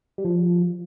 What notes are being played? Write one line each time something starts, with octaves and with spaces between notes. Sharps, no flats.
G3
F3